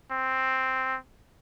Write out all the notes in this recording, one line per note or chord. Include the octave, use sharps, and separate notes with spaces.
C4